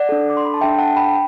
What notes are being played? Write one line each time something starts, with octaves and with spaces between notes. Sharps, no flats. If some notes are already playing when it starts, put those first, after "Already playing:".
Already playing: D5 F#5
D4 A4
D6
C6
B5
A5
D4 A4 E5 G5
F#5 A5
G5 B5